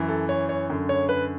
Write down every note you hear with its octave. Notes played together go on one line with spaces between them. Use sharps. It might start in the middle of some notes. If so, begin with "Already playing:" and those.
Already playing: F#2 E3
A4
C#5
C#5
F#2 D3
C#5
B4